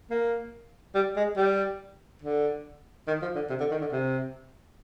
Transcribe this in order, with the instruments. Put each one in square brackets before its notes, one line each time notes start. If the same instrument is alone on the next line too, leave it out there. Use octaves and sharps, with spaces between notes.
[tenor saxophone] A#3
G3
G#3
G3
D3
D#3
F3
D3
C3
D3
D#3
D3
C3